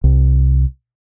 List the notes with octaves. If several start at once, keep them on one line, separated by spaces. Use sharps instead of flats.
C2